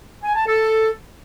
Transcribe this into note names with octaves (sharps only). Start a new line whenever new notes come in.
G#5
A5
A4